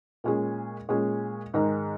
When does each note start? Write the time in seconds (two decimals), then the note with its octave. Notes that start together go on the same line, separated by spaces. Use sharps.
0.24 A#2 G#3 C#4 G#4
0.89 A#2 G#3 C#4 G#4
1.54 G#2 D#3 G#3 D#4 A#4